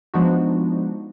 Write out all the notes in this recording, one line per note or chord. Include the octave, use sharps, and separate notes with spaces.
F3 G#3 B3 D4 D#4 F#4